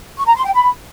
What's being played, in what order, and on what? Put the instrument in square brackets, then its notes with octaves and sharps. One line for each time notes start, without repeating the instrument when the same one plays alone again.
[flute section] C#6
A#5
C6
G5
B5